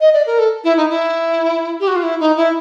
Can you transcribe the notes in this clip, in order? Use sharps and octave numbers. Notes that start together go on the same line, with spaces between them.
D#5
D5
A#4
A4
E4
D#4
E4
G4
F#4
F4
E4
D#4
E4